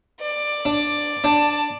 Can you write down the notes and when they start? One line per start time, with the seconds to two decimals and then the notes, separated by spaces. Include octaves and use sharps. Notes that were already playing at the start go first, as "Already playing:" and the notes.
0.21 D5
0.65 D4
1.24 D4 A5